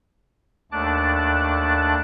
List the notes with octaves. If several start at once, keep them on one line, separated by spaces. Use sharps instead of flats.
D#2 A3 D4 A5 D6 F#6